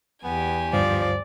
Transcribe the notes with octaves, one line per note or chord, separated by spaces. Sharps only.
E2 B3 G4 G#5
D2 G2 F3 C5 D5